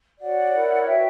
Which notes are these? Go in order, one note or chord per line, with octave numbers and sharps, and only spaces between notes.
F#4 C#5 D5 F#5
E4 A#4 C#5
F#4 B4 E5 G5